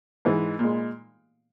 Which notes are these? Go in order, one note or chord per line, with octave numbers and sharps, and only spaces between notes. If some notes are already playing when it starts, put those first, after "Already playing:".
G#2 E3 G#3
A#2 G#3